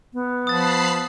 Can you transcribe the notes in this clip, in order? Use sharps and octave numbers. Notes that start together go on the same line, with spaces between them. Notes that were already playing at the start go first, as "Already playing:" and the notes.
B3
F3 A5 B5 D#6 A6 C7